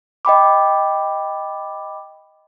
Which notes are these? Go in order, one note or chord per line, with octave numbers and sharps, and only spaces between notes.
D#5 G5 B5 D6